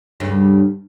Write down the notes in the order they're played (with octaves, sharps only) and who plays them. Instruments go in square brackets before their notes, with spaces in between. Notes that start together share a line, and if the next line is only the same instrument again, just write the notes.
[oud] D2 G2 C#3